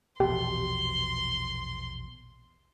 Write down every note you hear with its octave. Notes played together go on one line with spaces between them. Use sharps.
A#1 E2 B2 G4 C6